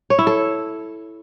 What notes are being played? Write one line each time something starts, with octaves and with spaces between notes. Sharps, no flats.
C#5
E4
A4